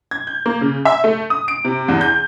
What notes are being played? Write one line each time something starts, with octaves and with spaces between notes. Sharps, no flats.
G#6
G6
A#3
C#3
E5
A3
D#6
D7
C3
E2
G6